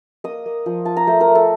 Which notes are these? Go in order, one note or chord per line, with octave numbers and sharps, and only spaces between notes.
A#3 D#5 D#6
A#3
F3
F4 A5
A#5
A3 C5 C6
A#4 A#5
A3
A4 A5